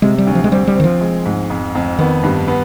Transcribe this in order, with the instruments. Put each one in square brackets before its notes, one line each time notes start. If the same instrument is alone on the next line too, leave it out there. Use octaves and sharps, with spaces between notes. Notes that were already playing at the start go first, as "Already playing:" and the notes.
[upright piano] C3 [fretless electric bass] G#3
[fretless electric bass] G3
[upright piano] D2
[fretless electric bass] F3
G#3
[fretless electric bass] G3 [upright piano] C4
[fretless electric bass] G3
[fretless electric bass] D#3 [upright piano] C4
[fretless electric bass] F3
[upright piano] G#3
G#2
F2
F2
[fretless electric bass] D#3 [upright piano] B3
[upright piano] G2
B3